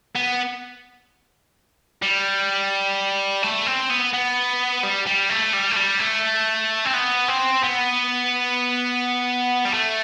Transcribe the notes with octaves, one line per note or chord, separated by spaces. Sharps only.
B3
G3
A3
C4
B3
B3
G3
G3
A3
G3
A3
G3
A3
C4
B3
C4
B3
G3
A3